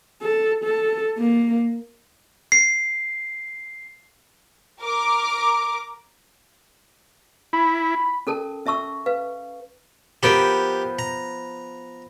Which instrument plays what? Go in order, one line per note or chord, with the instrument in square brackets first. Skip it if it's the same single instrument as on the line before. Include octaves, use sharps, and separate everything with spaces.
[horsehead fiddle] A4
A4
A#3
[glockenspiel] C7
[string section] A#4 D6
[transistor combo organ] E4 [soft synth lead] B5
[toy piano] C#4 A4 A#4 A5
C#4 E5 A5 C#6 E6
B4 F5
[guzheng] F3 B3 G5 [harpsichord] G4 A#4
[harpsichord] A#5